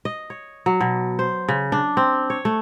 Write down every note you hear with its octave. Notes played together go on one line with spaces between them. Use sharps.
D#5
C#5
F#3
B2
C5
C#3
D4
C4
C#5
A3